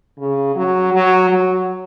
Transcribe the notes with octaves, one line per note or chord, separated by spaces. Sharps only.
C#3
F#3
F#3
F#3